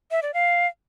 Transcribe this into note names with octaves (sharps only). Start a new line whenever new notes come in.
E5
D5
F5